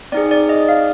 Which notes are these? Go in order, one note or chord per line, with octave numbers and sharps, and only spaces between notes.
C4 D#4 G#4 D5
D5
D#5
F5